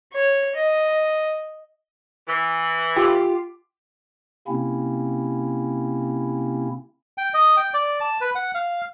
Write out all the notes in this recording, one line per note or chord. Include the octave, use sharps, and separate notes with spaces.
C#5
D#5
E3
F4 G4
C3 A#3 C4 C#4 E4
G5
D#5
G5
D5
A5
B4
F#5
F5